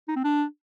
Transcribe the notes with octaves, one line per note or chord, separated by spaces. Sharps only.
D#4
C4
D4